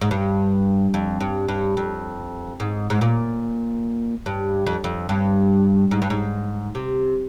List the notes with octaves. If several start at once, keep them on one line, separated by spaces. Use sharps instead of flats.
G#2
G2
F2
G2
G2
F2
G#2
G#2
A#2
G2
F2
F2
G2
G#2
G2
G#2
C3